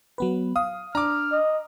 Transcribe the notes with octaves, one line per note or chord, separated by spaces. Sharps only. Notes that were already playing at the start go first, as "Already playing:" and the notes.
F#3 B3 B4
F5 D#6
D4 A#5 D6 F6
D#5